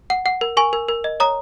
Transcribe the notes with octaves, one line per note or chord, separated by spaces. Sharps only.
F#5
F#5
A#4
A#4 G#5 C#6
A#4
A#4
D#5
C#5 A#5 D#6